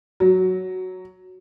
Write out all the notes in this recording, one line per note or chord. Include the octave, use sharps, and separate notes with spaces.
F#3